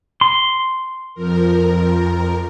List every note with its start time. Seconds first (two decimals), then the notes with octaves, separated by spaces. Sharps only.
0.21 C6
1.14 F2 F3 A#4